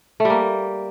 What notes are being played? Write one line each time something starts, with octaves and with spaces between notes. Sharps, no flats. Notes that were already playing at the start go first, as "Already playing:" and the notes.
A3
G3
A#3